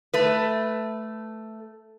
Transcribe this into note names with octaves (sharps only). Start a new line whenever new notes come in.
A3 B4